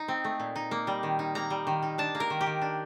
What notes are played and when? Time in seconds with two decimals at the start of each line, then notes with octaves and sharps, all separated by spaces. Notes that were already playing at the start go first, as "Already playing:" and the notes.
Already playing: D#4
0.08 C4
0.24 A3
0.40 A#2
0.56 D#4
0.71 A#3
0.87 G3
1.03 D#3
1.19 D#4
1.35 A#3 A#5
1.50 G3
1.67 D#3
1.82 D#4
1.98 D4 A5
2.15 A#3
2.20 A#4
2.30 D#3
2.41 G4
2.46 D#3
2.62 D4